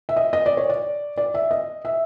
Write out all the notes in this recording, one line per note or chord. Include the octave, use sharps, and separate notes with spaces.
E5
D#5
D#5
D5
C#5
D5
D5
E5
D#5
E5